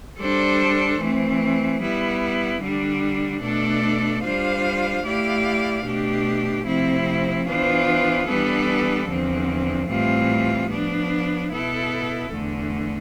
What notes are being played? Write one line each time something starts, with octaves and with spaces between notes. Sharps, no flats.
G3 D4 A4 C5
E3 A3 C4
G3 B3 E4
D3 G3 D4
B2 A3 D4 A4 D5
G3 D4 F4 C5 F5
A3 E4 G4 D5 F5
B2 A3 D4 G4
C3 F3 A3 C4 E4
E3 B3 D4 F4 C5
E3 G3 B3 D4 A4
E2 D3 F3 C4
A2 E3 G3 C4 F4
F3 B3 D4
B2 B3 E4 A4
E2 D3 A3